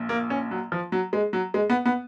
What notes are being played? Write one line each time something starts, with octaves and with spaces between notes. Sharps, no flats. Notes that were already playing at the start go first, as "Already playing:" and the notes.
Already playing: A#1 A#2
A#3
C#4
F#3
F3
F#3
G#3
F#3
G#3
B3
B3